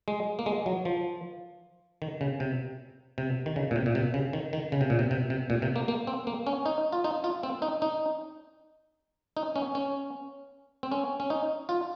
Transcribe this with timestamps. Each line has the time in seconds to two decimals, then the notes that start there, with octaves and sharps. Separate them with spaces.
0.08 G#3
0.39 A#3
0.46 G#3
0.66 F#3
0.85 F3
2.02 D#3
2.21 C#3
2.40 C3
3.18 C3
3.46 D#3
3.56 C#3
3.71 A#2
3.76 C3
3.86 A#2
3.95 C3
4.14 C#3
4.33 D#3
4.53 D#3
4.72 C#3
4.81 C3
4.90 A#2
4.99 C3
5.11 C3
5.30 C3
5.50 A#2
5.62 C3
5.76 A#3
5.88 A#3
6.07 C4
6.27 A#3
6.47 C#4
6.66 D#4
6.93 F4
7.04 D#4
7.24 F4
7.43 C4
7.62 D#4
7.82 D#4
9.37 D#4
9.56 C#4
9.75 C#4
10.83 C4
10.91 C#4
11.20 C#4
11.30 D#4
11.69 F4